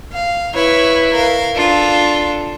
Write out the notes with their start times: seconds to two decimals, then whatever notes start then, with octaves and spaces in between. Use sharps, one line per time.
0.12 F5
0.55 E4 B4 C#5
1.12 A#4 F5
1.56 D4 F4 A4